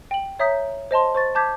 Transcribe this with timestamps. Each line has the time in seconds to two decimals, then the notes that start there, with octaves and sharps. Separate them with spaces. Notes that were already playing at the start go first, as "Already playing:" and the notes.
0.11 G5 F#7
0.39 C#5 E5 A#5 D#6 G6 B6
0.91 C5 D#5 A5 C6
1.15 C5 C#6 A6
1.35 A5 D6 G6 G#6 B6